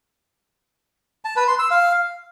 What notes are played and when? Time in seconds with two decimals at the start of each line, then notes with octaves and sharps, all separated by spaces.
1.25 A5
1.36 B4
1.48 C6
1.59 E6
1.71 F5